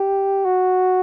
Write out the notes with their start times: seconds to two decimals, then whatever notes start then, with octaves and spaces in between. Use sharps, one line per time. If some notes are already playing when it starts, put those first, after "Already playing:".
Already playing: G4
0.45 F#4